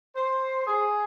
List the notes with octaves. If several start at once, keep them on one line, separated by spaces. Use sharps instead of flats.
C5
G#4